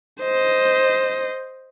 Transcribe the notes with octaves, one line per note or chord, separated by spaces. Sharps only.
C5 D#5